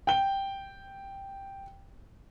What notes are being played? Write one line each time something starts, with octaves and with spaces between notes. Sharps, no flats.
G5 G7